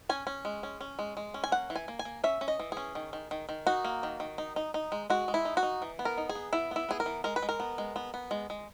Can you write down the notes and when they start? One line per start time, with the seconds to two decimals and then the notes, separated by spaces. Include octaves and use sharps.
0.09 C#4 G#5
0.27 C#4
0.45 G#3
0.63 C#4
0.81 C#4
0.99 G#3
1.17 G#3
1.34 C#4
1.44 G#5
1.52 A#3 F#5
1.70 E3
1.76 G#5
1.88 A#3
1.99 G#5
2.05 A#3
2.24 C#4 E5
2.41 C#4
2.48 D#5
2.59 E3
2.72 C#4 G#4
2.95 D#3
3.13 D#3
3.31 D#3
3.49 D#3
3.67 D#4 F#4
3.85 A#3
4.03 D#3
4.20 D#3
4.38 D#4
4.56 D#4
4.74 D#4
4.92 G#3
5.10 G#3 F#4
5.28 G#3
5.34 E4
5.45 D#4
5.57 F#4
5.63 D#4
5.82 E3
5.99 B3
6.05 A#4
6.18 D#4
6.29 G#4
6.35 B3
6.53 B3 E4
6.71 B3 E4
6.89 B3 G#4
7.00 A#4
7.06 E3
7.24 G#3 A#4
7.36 B4
7.42 G#3
7.49 A#4
7.60 B3
7.78 G#3
7.96 B3
8.14 B3
8.31 G#3
8.50 G#3